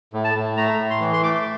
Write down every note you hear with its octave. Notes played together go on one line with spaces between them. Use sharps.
A2
A5
A2
A3 A#5
A2
C6
E3
C6
A3 D6